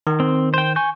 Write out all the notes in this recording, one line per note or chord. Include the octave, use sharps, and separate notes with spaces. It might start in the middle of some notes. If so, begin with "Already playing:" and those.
D#3
C4
C5 G5
G#5 C#6 G6